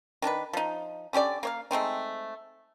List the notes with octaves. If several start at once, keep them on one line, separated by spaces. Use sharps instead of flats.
D#3 D4 D#4 B4
F3 D#4
D3 C#4 G4 D5
A#3 C#5 F5
G#3 A3 C4 D#4